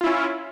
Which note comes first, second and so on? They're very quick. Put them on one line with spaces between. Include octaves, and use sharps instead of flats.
F4 E4 C#4